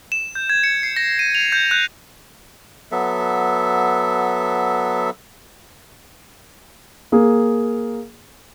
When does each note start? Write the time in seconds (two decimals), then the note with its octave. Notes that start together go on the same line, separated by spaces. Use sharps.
0.12 E7
0.35 G6
0.50 G#6
0.64 C#7
0.83 C7
0.96 A#6
1.19 D#7
1.35 F7
1.52 G6
1.71 F#6
2.92 F#3 B3 A4 E5
7.12 A#3 G#4